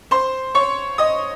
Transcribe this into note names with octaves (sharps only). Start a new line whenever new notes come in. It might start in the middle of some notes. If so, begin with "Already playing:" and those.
C5 C6
C#5 C#6
D#5 D#6